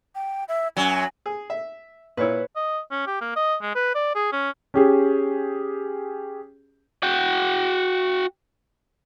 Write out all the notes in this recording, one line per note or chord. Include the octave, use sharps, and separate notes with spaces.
G5
E5
F#2 F#3 G#5
G#4
E5
A#2 E4 B4 C#5
D#5
C#4
G4
A#3
D#5
G#3
B4
D5
G#4
C#4
C#4 G4 G#4
F#4 G5